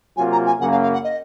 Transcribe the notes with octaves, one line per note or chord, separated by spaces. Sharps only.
C3 F#3 A#3 F4 G#5
A#5
G#5
F#2 C#3 F#3 A#3 F#5
F5
F5
F#5
D#5